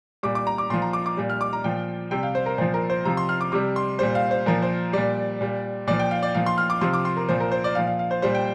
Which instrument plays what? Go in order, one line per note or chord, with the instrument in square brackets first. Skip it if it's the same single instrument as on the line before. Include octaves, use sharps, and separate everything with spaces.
[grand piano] A#2 G3 D6
D6
A#5
D6
A#2 F3 C6
A#5
D6
D6
A#2 G3
F6
D6
A#5
A#2 F3 G5
C3 G3 G5
F5
C5
A#4
A#2 F3 C5
A#4
C5
C3 F3 A#5
C6
F6
D6
C3 G3 D6
C6
A#2 G3 C5
F5
C5
A#2 F3 A#4
C5
A#2 G3 D5
A#2 G3
A#2 F3 D5
G5
F5
D5
A#2 F3 F5
C6
F6
D6
C3 F3 C6
D6
C6
A#4
A#2 F3 C5
A#4
C5
D5
A#2 F3 F5
F5
F5
C5
A#2 G3 C5
G5